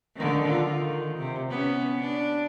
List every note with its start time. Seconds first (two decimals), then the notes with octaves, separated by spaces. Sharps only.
0.16 D3 D#3
0.48 F4
0.77 D#3
1.18 C3
1.51 B3 C#4
2.01 D4